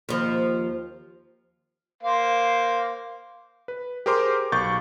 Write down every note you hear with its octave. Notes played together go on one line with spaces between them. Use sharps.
D#2 F3
A#3 C5 F5
B4
G4 G#4 A#4 C5 C6 D6
B1 C#6 G6 A6